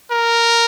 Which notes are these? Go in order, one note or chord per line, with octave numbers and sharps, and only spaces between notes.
A#4